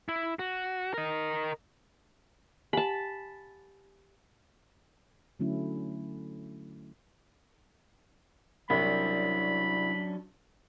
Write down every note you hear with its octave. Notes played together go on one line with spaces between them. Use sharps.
E4
F#4
A#4 D#5
G4 F#5 G#5 A5 B5
D3 F#3 A3 C#4 E4
C2 F#3 C#4 D4 B5